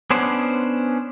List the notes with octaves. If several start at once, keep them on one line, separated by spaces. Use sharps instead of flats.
B3 C#4 D4 C5